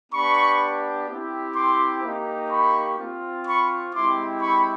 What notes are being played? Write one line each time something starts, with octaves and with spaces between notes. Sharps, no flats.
B3 D4 G4 B5 C#6
C4 E4 G4
C6 D6
A#3 D#4 G4
B5 C#6
C4 F4
B5 C#6
G#3 C4 E4 G4 C6 D6
B5 C#6